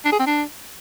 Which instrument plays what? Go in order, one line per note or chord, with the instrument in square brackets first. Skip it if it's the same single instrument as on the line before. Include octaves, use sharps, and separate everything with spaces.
[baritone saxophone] D4
G#4
C4
D4